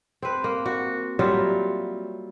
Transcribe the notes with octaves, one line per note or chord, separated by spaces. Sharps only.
C4 B4
A#3
F#4
F#3 G3 F4 E5